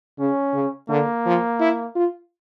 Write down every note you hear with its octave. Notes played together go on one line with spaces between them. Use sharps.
C#3 C#4
C#3
D3 A#3
F3
E4
F4